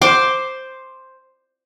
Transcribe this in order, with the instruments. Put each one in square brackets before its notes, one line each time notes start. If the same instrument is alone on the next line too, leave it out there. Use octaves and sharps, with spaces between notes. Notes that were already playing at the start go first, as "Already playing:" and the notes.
[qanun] C5 C6 D6